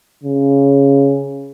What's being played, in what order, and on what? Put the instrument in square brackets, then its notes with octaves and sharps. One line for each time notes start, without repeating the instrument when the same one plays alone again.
[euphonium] C#3